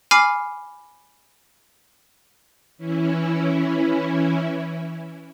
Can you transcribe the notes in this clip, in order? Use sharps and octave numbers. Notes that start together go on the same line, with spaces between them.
G#5 B5 D6 F6 C7
E3 C#4 E4